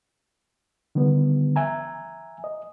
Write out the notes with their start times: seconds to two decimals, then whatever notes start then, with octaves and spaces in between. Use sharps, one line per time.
0.95 D3 D#3 G3 B3
1.56 E5 G#5 A#5
2.44 D#5